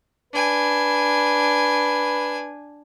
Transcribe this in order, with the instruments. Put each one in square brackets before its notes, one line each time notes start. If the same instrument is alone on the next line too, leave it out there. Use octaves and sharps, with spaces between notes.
[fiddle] D4 G#5 [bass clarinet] B4